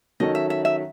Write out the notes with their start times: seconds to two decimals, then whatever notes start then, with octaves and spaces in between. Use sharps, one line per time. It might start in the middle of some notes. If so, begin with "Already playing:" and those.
0.20 D#3 F#3 C#4 F#4 A4 D#5
0.35 E5
0.50 E5
0.65 E5